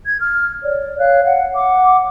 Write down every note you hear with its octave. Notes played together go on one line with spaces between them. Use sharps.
G#6
F6
C#5 D5
C#5 F5 F#6
F5 F#5
F#5 D6